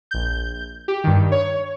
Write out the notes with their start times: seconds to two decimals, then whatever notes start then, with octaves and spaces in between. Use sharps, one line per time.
0.11 A#1 G6
0.88 G4
1.04 G2 D#3
1.32 C#5